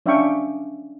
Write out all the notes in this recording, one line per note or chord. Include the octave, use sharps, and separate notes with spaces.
C#4 D4 E5 F5 G5 C#6